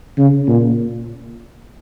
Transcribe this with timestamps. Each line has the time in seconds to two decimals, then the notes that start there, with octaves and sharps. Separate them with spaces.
0.18 C#3
0.48 A#2